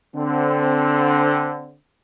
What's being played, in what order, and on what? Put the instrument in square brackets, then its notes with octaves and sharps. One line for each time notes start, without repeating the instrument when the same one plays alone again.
[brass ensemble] D3 C4